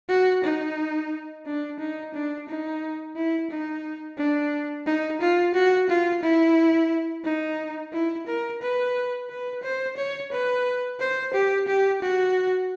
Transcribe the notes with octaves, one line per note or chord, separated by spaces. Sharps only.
F#4
D#4
D4
D#4
D4
D#4
E4
D#4
D4
D#4
F4
F#4
F4
E4
D#4
E4
A#4
B4
B4
C5
C#5
B4
C5
G4
G4
F#4